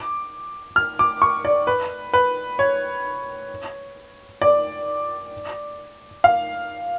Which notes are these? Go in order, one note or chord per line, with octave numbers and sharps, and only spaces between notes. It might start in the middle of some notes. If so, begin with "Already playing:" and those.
Already playing: D6
F6
D6
C#6
D5
B4
B4
C#5
D5
F5